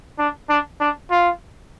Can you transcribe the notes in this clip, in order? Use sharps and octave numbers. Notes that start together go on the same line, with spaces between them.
D4
D4
D4
F4